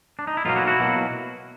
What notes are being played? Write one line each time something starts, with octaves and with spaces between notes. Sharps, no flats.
D4
D#4
E4
B1 B2 F#3 A#3 D#4 F4
E4 F#4
E4 F#4
B2 F#3 A#3